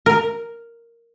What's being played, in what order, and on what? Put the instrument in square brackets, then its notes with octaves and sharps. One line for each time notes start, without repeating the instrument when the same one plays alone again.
[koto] A#4